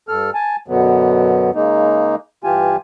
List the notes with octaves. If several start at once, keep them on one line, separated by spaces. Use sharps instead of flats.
G2 A4 F6
G#5 A5
F#2 B2 D3 F#3 B3
C#3 G#3 A#3 D#4
G2 E3 F4 G4 G#5